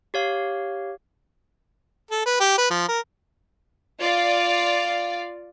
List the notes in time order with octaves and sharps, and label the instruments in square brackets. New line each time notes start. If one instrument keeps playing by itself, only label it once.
[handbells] G4 C#5 F5
[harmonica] A4
B4
G4
B4
F3
A#4
[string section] F4 D5